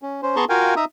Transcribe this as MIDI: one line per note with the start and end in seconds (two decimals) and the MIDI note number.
0.02 0.21 61
0.22 0.36 61
0.22 0.36 72
0.36 0.45 59
0.36 0.45 68
0.36 0.45 81
0.36 0.45 82
0.36 0.45 84
0.36 0.45 85
0.49 0.74 65
0.49 0.74 66
0.49 0.74 70
0.49 0.74 77
0.49 0.74 79
0.49 0.74 80
0.76 0.85 63
0.76 0.85 76
0.76 0.85 82
0.76 0.85 87